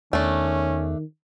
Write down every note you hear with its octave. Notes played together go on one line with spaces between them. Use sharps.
E2 D#3 A3 C#4 D4